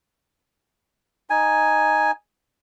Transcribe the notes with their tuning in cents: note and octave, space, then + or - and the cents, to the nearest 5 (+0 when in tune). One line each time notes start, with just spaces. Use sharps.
D#4 +0 G#5 +0